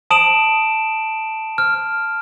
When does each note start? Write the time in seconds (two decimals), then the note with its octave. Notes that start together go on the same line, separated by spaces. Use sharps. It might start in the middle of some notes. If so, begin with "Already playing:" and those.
0.11 A5 D#6 D7 E7 F#7
1.58 F6